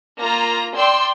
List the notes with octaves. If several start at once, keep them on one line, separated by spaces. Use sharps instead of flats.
A#3 F4 A#5 A#6
D5 G5 C6 E6